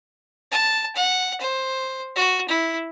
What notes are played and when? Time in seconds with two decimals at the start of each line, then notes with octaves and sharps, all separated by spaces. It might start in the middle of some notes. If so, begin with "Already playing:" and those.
0.51 A5
0.96 F#5
1.41 C5
2.16 F#4
2.48 E4